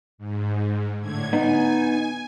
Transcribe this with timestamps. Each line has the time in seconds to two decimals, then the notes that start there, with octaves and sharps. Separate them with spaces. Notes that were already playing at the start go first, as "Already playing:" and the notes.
0.18 G#2
1.00 A2 D3 G#6
1.33 B3 D#4 G#5